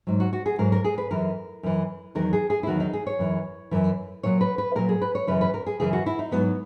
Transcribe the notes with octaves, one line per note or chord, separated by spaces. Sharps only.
G#2 F#3
F#4
F#4
G#4
G#2 F#3 A#4
A#4
G#4
B4
F#2 E3 A#4
F#2 E3
E2 D#3 F#3 A#4
G#4
G#4
E4
E2 D#3 F#3 F#4
D#4
G#4
C#5
F#2 E3
F#2 E3
A#2 F#3 C#5
B4
B4
A#2 F#3 A#4
G#4
B4
C#5
F#2 C#3 E3 B4
B4
A#4
G#4
F#2 C#3 E3 G#4
F#4
E4
D#4
G#2 F#3 B3